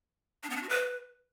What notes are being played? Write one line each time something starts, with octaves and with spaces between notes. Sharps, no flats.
D4
B3
D4
F#4
B4